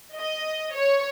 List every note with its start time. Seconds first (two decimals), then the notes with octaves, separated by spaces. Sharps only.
0.16 D#5
0.75 C#5